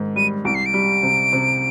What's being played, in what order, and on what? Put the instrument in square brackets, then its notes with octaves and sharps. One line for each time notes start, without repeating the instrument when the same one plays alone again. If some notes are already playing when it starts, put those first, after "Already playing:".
Already playing: [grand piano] G#2 D#3
[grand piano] G3 [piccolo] D#7
[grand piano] C2 [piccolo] D7
[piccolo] C7
D7
[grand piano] G3
C3
C3